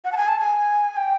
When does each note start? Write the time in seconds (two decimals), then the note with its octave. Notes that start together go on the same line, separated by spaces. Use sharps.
0.05 F#5
0.12 A5
0.17 G#5
0.28 A5
0.39 G#5
0.97 G5